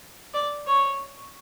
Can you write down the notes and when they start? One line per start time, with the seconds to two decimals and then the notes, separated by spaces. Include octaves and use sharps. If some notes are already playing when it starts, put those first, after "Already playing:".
0.34 D5
0.67 C#5